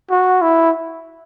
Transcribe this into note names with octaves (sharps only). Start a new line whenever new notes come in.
F#4
E4